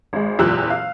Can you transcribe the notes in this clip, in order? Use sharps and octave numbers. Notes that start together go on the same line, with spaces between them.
G#1 G#3
F#1 E2 A#2 G4 E6 F#6
F5